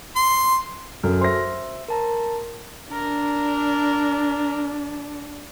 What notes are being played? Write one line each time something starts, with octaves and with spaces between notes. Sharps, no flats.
C6
F#2 F#4 A4 F6
C5 E5 C6 A#6
A#4 A5 A#5
D4 A#4